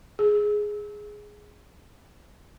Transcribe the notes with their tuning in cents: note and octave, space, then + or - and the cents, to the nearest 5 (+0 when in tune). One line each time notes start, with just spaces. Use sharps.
G#4 +5